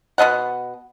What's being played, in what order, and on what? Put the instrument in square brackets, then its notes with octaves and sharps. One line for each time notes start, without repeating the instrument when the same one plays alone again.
[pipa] B2 D4 D#5 F#5